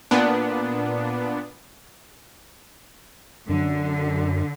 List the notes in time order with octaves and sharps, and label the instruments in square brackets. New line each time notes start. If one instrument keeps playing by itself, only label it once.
[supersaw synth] A#2 B3 D4
[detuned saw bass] F#2 [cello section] D3